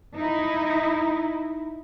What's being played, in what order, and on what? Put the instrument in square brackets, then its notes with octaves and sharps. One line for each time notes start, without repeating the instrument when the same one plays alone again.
[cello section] D#4 E4